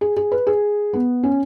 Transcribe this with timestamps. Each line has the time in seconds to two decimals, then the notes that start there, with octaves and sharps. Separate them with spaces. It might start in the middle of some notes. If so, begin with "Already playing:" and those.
0.01 G#4
0.17 G#4
0.32 B4
0.47 G#4
0.93 B3
1.23 C#4